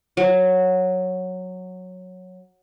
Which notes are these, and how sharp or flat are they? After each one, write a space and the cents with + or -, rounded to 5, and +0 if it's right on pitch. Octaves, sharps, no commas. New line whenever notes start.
F#3 -10